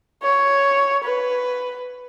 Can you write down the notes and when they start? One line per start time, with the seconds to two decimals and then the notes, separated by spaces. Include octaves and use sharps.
0.22 C#5
1.04 B4